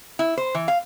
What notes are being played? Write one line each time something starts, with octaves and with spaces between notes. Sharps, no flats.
E4
C5
E3
F5